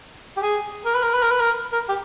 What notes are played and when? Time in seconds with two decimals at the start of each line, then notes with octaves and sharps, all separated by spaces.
0.37 G4
0.43 G#4
0.86 A#4
0.95 B4
1.04 A#4
1.14 B4
1.23 A#4
1.32 B4
1.41 A#4
1.73 A#4
1.89 G4